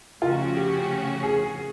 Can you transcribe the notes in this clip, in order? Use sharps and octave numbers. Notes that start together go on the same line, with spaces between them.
C#3 F3 A3 C#4 F4 F#4
G4
G#4